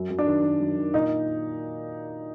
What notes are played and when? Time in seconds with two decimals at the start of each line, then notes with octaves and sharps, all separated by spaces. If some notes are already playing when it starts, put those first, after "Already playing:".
Already playing: F#2
0.10 F#2
0.19 D4
0.27 D#3
0.43 D#3
0.60 F#2
0.77 D#3
0.94 A#2 D#4